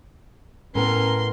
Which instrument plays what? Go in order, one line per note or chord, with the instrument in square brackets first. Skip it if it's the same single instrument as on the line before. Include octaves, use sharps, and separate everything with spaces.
[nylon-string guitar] A2 B3 [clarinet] C#4 [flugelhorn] A#4 [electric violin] C6